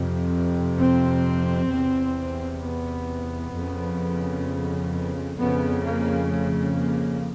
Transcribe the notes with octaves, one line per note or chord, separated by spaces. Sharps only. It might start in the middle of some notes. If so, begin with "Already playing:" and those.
Already playing: F2 C3
C4
E2 C3
B3
F2 C#3
F2 C#3 B3
A#3
A3
A#3